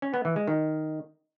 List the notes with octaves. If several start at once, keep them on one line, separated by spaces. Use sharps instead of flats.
C#4
B3
E3
G#3
D#3